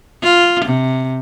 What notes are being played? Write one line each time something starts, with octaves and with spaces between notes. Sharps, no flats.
F4
C3